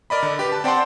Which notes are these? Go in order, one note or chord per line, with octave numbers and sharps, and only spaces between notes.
A#4 D5 D#5 B5
D3
G4 B4
A5
C4 D5 F#5 G5 A5 C6